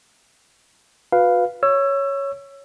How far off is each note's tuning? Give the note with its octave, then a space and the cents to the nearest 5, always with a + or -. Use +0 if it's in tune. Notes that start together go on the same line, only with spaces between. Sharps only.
F#4 -35 B4 +0 F5 +0
C#5 +0 E6 +25